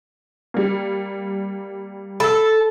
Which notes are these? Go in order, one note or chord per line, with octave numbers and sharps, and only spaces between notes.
G3 A#3
A4 B5 E6